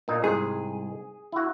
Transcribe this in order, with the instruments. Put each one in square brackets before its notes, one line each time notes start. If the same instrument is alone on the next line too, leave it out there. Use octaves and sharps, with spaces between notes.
[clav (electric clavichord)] A#2 D#4
[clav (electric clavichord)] C2 G#2 [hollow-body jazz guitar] G#4
[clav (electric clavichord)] E4 F#4